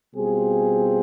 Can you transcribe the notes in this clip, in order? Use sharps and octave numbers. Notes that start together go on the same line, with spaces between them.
B2 G3 C4 F4 G#4